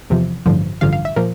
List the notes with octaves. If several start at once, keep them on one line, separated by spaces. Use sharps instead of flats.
E2 C3 F3
A1 G2 D3 F3
A1 G2 D3 F3 F5
F5
E5
A#2 F3 A#4